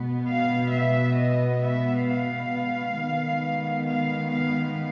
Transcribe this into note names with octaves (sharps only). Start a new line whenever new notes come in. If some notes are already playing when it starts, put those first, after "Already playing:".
Already playing: B2 G#3 B3
F5
E5
D#5
E5
F5
D#3 G#3 B3
F5
F5